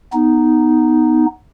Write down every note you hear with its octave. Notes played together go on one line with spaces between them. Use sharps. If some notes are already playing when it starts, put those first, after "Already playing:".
B3 D#4